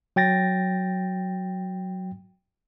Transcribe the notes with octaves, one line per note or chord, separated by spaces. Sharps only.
F#3 G5 A6 A#6